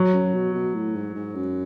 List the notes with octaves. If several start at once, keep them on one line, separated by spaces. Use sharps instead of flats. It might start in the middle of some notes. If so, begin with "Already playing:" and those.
Already playing: F#3
F#2
B2
B2
A2
G#2
G#2
F#2